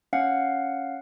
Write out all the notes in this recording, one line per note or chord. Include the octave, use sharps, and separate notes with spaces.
C#4 F5 F#5